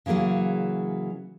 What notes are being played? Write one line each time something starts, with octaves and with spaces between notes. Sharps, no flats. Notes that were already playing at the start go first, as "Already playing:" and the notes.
C#3 E3 F#3 A#3 G#4